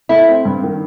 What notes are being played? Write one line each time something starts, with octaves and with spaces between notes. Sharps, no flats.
A3 E4
C4
G2
D#3